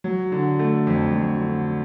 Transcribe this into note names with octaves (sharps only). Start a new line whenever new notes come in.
F#3
D3
A3
F2
F#3
D3